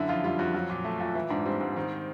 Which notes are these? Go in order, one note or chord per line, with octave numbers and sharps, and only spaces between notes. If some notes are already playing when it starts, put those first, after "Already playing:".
Already playing: F#2 D3 E4
F2 F4
G3 F4
F2 F#4
F#3 F#4
A#2
A3
A#2
E3 E4
G#2 D4
G3 C4
G#2
D#3